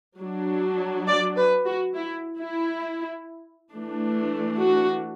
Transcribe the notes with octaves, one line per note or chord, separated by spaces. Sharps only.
F#3 D4
D5
B4
F#4
E4
E4
E3 A3 D4
F#4